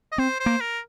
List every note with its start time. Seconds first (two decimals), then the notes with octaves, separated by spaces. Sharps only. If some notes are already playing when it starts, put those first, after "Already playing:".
0.12 D#5
0.18 C4 C5
0.40 C5
0.46 A#3
0.61 A#4